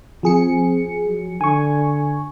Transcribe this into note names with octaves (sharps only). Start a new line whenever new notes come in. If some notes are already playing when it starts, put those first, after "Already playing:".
F3 C4 G#4 C#7
F#3
D3 G#5 C#6